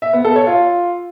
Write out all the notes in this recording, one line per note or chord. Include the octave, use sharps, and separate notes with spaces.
E5
B3
A4
C#5
F4